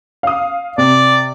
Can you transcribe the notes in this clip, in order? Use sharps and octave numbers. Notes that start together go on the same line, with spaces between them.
F5 D#6
C3 D5